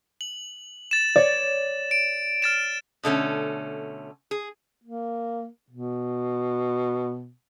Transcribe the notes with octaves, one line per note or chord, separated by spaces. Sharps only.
F#7
A6 E7
C#5 D5
D7
F6 A6 E7
B2 D3 A3 C#4
G#4
A#3
B2